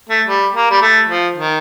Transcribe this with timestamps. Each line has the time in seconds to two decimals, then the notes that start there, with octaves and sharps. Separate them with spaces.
0.09 A3
0.28 G3
0.55 A#3
0.71 G3
0.82 A3
1.09 F3
1.36 D#3